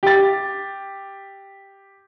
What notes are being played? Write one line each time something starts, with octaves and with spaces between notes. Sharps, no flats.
G4 A6